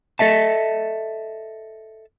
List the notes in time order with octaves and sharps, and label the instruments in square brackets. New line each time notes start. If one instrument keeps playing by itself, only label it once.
[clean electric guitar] A4 D#5 E5 A5